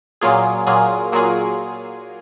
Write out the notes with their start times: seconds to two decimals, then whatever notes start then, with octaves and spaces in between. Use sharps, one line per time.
0.21 A#2 F#3 A#3 F4 G#4
0.67 A#2 F#3 A#3 F4 G#4
1.12 A#2 F#3 A#3 F4 G#4